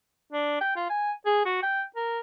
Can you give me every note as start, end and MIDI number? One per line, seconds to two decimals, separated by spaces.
0.32 0.57 62
0.61 0.73 79
0.76 0.86 65
0.90 1.12 80
1.26 1.44 68
1.46 1.59 66
1.63 1.83 79
1.96 2.20 70